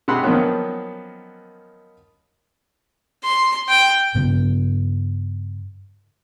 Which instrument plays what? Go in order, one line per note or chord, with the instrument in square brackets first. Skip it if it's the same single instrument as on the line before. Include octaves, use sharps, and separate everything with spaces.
[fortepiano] C3 G#3 G4 F#5 B5 C6
D#3 F3 F#3 A#3 B3 C#4
[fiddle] C6
G5
[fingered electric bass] G2 C#3 B3